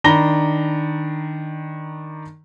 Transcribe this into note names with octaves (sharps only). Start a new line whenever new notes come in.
D#3 D4 A#5 B5 A#6 G7